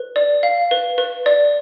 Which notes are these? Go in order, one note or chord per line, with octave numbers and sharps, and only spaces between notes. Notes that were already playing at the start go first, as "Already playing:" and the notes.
Already playing: B4
D5
F5
B4
B4
D5